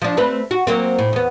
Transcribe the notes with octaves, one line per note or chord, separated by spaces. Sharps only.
F3 D4
A3 C4 B4
F#4
F#3 A#3 C4
A2
E2 B3